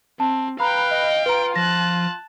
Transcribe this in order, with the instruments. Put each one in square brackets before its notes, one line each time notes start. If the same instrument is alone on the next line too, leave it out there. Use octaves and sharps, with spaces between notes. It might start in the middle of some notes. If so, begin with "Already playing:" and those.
[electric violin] C4 [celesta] A5
[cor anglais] B4 [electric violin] F5 G5 [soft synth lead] A#5 [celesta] B5
[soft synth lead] D#5
[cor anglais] F4 [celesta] B4 A#5 [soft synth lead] D7
[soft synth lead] F3 [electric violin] A5 F#6 [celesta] A#6